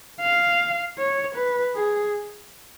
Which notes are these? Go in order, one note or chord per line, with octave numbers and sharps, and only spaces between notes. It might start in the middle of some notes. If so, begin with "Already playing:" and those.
F5
C#5
B4
G#4